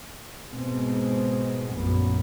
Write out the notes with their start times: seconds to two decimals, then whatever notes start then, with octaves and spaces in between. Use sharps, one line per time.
0.52 G#2 B2 G#3 C4
1.72 A#1 F#2 A2 B3